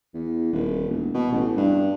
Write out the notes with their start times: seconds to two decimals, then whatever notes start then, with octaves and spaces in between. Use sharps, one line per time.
0.14 E2
0.53 D#1
0.89 E1
1.14 B2
1.32 A1
1.57 G2